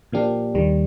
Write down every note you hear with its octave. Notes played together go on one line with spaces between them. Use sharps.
A#2 F3 A#3 D4 G4
D#2 D#3 G3